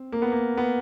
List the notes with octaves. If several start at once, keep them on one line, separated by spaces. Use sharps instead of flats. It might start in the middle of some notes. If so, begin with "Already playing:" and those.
Already playing: C4
A#3
B3
A#3
B3